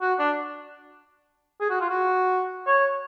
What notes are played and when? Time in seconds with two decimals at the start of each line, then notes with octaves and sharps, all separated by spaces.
0.01 F#4
0.19 D4
1.61 G#4
1.70 F#4
1.81 F4
1.89 F#4
2.67 C#5